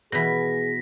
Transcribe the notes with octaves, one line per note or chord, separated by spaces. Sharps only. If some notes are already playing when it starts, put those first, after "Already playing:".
B2 E3 G#4 A#6 B6